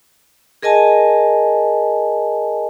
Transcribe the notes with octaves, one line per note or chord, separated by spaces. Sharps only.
G#4 A#4 D#5 G#5 A5